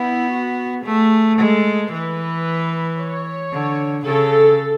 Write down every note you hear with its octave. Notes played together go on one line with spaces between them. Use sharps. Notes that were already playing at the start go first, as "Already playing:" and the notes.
Already playing: B3 E4
F#4
A3 G#4
G#3 A4
E3 B4
C#5
D3
C#3 A4